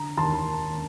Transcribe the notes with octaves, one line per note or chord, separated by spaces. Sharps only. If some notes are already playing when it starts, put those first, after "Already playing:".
Already playing: D3 A#5
D#2 A5 C6